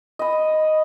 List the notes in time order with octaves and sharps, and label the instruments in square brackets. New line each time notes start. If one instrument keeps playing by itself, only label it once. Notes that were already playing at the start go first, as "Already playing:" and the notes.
[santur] D#5 B5